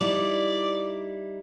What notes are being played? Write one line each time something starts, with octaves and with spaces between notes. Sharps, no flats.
G3 D#4 E4 D5